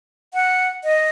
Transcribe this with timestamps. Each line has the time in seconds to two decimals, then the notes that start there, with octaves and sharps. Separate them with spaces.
0.34 F#5
0.84 D#5